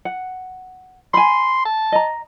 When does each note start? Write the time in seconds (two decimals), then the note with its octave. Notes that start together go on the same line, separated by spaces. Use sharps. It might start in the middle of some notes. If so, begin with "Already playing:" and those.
0.05 F#5
1.14 G#5 B5 C6
1.65 A5
1.92 D#5 A#5